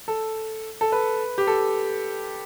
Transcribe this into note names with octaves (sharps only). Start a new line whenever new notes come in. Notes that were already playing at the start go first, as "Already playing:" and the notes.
A4
A4
B4
G4
A4